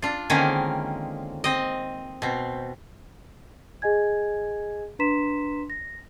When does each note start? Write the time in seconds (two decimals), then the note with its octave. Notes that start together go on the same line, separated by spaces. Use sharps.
0.02 D4 F4
0.30 D3 D#3 G#3 A#3 C4 C#4
1.44 C4 D#5
2.22 B2 C4
3.82 G#4 D#5 G#5 G#6
4.99 D4 B4 A#5 C6 B6 E7
5.70 A#6